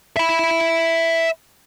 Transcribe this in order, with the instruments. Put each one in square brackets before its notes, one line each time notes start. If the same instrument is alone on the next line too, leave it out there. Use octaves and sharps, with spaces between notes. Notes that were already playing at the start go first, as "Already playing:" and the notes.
[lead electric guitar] E5 B5